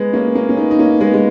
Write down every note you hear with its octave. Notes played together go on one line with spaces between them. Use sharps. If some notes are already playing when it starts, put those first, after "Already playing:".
Already playing: G#3 B3
A#3 C#4
A#3 C#4
C#4
B3 D#4
D#4
A#3 C#4
G#3 B3
G#3